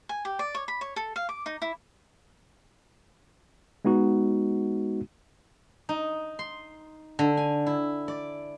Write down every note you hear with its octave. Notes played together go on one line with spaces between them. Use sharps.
G#5
G4
D5
C#5
B5
C#5
A4
F5
D6
D#4
E4
G#3 B3 D#4 F#4
D#4
C6
D3
G#5
E4
D5